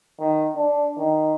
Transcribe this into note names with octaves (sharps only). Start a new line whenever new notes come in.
D#3
D4
D#3